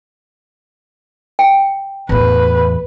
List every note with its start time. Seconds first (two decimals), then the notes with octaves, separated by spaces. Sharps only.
1.39 G5
2.09 E2 A2 B4